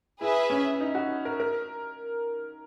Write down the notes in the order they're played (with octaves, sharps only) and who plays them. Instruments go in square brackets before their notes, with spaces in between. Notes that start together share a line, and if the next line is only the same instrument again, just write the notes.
[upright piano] E4 [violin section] G#4 B4 E5
[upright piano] C#4
D#4
F#4
A#4
A#4